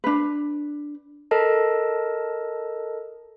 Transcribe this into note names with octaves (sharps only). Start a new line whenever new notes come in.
D4 B4
A4 A#4 D#5 A5